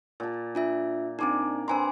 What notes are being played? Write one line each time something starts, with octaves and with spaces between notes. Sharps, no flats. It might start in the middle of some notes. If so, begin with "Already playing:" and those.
A#2 A5
D4 F4 E5
C4 D4 D#4 A#4 D5 D6
C4 D4 B4 G#5 A#5 C6